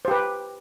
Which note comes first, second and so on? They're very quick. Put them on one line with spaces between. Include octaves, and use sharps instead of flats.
C5 G4 B4